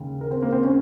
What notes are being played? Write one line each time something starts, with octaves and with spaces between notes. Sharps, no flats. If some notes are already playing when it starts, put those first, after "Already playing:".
Already playing: D#2 C#3 G#3
A#4
C4
A#3
C4
C#4